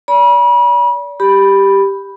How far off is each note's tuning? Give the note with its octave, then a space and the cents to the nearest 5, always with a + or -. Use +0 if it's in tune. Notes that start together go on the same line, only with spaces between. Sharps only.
D5 -35 B5 -40
G4 +0 B5 +0